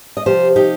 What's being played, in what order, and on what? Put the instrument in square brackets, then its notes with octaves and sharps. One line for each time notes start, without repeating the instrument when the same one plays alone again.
[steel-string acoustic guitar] D#5
C3 F3 G4 C5
D#4 G4